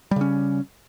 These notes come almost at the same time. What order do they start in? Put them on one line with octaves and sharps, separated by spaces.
G3 C#3 C#4